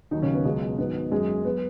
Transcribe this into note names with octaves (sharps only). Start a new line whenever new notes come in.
D#2 D#3 F#3 D#4
C#3 C#4
B3
C#2 B2 F#3 G#3
G#2 D#3 F#3 B3
F#2 F#3 G#3 G#4
F#3 B3 B4